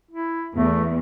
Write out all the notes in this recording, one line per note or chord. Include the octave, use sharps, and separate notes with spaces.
E4
E2 A3